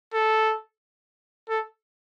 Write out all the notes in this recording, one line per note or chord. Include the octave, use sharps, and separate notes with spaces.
A4
A4